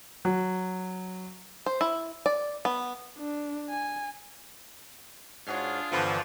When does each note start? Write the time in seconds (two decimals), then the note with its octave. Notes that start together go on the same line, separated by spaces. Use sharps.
0.25 F#3
1.66 C5
1.81 E4
2.26 D5
2.65 B3
3.18 D4
3.70 G#5
5.47 G#2 D4 F4 F#4 G#4 C#5 F6
5.92 G2 D3 E3 F3 B3 A4 B4